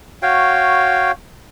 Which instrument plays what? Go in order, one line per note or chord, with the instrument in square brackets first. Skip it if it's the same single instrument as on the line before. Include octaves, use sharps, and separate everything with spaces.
[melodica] F#4 C#5 F5 G5